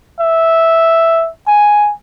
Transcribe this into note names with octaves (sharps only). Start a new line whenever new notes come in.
E5
G#5